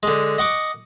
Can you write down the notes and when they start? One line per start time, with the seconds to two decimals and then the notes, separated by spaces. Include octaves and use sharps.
0.03 D3 G#3
0.38 D#5 F#5 C#6 D6